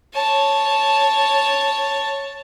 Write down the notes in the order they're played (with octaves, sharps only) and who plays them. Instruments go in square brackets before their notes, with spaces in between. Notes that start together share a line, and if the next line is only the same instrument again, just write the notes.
[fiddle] C#5 A5